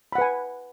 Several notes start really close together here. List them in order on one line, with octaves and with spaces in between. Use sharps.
B5 F#5 B4 G#5